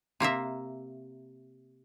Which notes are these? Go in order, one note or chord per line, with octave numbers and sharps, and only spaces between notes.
C3 A#3 A#4 E5